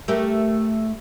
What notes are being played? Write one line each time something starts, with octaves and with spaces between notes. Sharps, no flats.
A3 G4 A#4